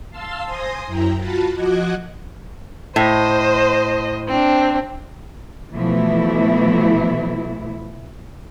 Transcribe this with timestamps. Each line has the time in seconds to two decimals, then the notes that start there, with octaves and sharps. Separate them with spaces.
0.10 F5 A5 C6 E6
0.45 C5 G#5 C6 D#6 A#6
0.86 F#2 E4 G5 A#5
1.17 F4 F#4 A5 B5
1.55 F3 F#4 D#5 D6 F#6 G#6
2.96 A2 C5 D#5
4.28 C4 D4
5.74 B2 E3 F3 A3 E4